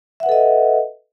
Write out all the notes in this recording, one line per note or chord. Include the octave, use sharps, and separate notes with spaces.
A4 B4 D#5 E5 F#5